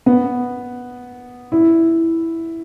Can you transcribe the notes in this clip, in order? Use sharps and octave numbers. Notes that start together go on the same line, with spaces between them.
B3
E4